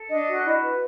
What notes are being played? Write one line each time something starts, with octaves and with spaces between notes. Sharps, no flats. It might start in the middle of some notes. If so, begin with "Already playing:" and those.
Already playing: A4
D4 D#5
F#4
E4
B4